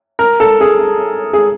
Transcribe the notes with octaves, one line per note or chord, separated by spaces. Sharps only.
A#4
A4
G#4
G#4